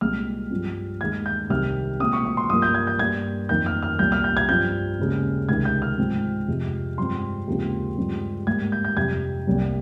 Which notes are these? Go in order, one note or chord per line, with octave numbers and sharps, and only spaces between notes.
C2 A#2 G#3 C4 F6
G2 F3 C4
D#2 D#3 G#3 G#6
G6
C2 C3 D#3 F6
A#2 G#3 C4 D#6
C#6
C#6
C6
G2 F3 A#3 D#6
G6
G#6
G6
G2 G3 A#3 G#6
F2 D#3 A#3 G6
F6
F6
C2 A#2 G3 G6
F6
G6
G#6
G2 F3 C4 G6
D#2 C#3 G#3 C4
C#2 C3 D#3 G#6
G6
F6
G#2 F3 G#3 C4
F2 C3 F3 G#3
G2 F3 G#3 C4 C6
D#2 C#3 F3 G#3 C4
G2 F3 G#3 C4
G#2 G3 A#3 G#6
G6
G6
F2 C3 G3 G#6
C2 C3 G3 A#3